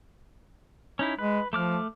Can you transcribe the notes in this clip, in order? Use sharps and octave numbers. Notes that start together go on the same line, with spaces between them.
C#4 D#4 E4
G#3 B4
F3 A3 D6 F6